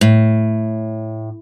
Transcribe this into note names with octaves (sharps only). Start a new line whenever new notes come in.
A2